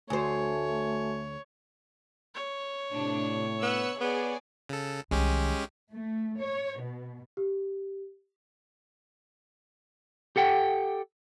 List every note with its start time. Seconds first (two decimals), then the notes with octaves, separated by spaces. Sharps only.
0.10 D2 A3 F#4 C5 C#5 G#5
2.35 C#5
2.93 A2 C3 D4
3.62 B3 E6 F#6
4.00 B3 G#4 D5
4.69 C#3 A4
5.11 C2 D#3 G#3 C#4 G4
5.91 A3
6.38 C#5
6.81 B2
7.37 G4
10.36 G4 A4 F#5 G5